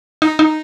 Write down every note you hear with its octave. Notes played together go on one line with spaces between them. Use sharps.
D#4
D#4